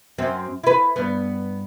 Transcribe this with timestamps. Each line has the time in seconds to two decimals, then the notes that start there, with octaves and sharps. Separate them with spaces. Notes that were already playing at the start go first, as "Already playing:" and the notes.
0.18 F#2 C4
0.64 E4 B4
0.96 G2 B3